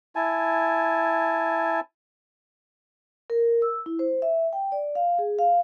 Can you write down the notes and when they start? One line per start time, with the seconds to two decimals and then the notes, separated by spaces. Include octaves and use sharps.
0.16 E4 G#5 A5
3.30 A#4
3.62 E6
3.86 E4
3.99 C5
4.22 E5
4.53 G5
4.72 D5
4.95 F5
5.19 G#4
5.39 F5